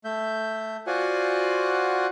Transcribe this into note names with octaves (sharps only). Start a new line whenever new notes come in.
A3 E5 G6
F4 F#4 C5 D5 F#5 G#5